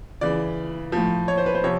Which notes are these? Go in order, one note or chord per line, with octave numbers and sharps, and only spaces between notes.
C#3 E3 D5
A2 F3
C#5
C5
B4
C5
C3 F3 C#5